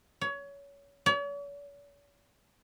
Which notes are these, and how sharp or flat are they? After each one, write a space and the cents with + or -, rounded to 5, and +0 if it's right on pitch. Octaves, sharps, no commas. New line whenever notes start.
C#5 +25
C#5 +45